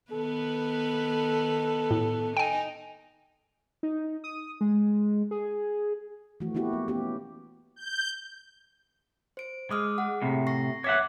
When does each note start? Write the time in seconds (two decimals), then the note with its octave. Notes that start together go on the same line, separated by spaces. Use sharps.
0.11 D#3 B3 A4 B4
1.91 A2
2.37 D#4 G5 G#5
3.83 D#4
4.24 D#6
4.61 G#3
5.31 G#4
6.40 E3 F3 A3 F#4
6.55 A#3 B3 E4 F#4 G4
6.73 B3
6.88 B3 C#4 F#4 G4
7.76 G6
9.37 C5 D7
9.71 G#3 D6 D#6 F6
9.98 G#4 F#5
10.22 A2 C3
10.47 C#6 A#6 C7
10.84 C#5 E5 F#5 D6